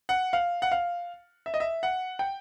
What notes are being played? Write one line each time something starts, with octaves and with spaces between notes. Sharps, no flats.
F#5
F5
F#5
F5
E5
D#5
E5
F#5
G5